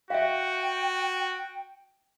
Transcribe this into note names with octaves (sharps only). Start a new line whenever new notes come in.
F#4 E5 F5 G5